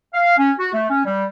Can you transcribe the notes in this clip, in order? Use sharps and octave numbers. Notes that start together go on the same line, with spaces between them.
F5
C#4
F#4
A3
C#4
G3